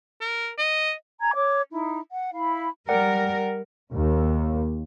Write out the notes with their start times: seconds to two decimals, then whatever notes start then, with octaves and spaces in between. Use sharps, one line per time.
0.21 A#4
0.58 D#5
1.20 G#5 A#5 G#6
1.35 C#5 D6
1.71 D#4 E4
2.11 F#5
2.32 E4 F5 B5
2.89 G3 A#4 D5 F#5 G5
3.92 D#2